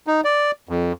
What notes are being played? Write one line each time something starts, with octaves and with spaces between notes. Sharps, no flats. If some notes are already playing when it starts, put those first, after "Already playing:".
D#4
D5
F2